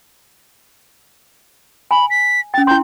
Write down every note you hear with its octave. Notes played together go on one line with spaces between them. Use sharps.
G#5 B5
B6
C#4 G5 A6
E4 G5 C6 G6